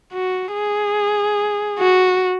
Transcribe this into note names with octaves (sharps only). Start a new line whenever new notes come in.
F#4
G#4
F#4